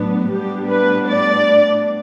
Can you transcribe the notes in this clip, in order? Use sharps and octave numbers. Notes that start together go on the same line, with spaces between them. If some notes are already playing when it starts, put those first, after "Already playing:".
Already playing: A2 F#3 B3 D4
A2 G3 B3 D4 G4
B4
D5